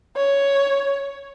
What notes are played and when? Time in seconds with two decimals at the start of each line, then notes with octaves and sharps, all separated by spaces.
0.16 C#5